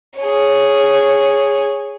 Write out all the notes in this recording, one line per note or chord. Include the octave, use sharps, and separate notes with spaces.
G#4 C#5